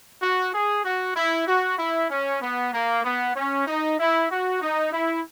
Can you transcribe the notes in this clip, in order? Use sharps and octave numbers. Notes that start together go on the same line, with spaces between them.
F#4
G#4
F#4
E4
F#4
E4
C#4
B3
A#3
B3
C#4
D#4
E4
F#4
D#4
E4